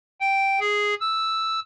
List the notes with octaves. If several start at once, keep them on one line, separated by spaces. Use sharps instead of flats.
G5
G#4
E6